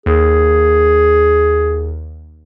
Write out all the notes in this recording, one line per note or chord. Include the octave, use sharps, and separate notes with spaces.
D#2 G#4